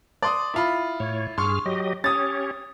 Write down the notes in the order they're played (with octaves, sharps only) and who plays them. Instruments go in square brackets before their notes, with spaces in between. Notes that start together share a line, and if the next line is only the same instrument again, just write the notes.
[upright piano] D5 C6 D#6
E4 F4 B5
[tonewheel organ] A2 C#5
[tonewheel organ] G2 G#4 F6 [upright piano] C6 C#6
[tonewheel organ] F#3 G4 D#5
[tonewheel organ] C#4 G4 C#5 [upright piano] D#6 A6